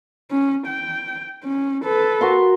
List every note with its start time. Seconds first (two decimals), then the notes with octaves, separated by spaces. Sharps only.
0.31 C#4
0.67 G5
1.44 C#4
1.85 A4 B4
2.21 F#4 A#4 C6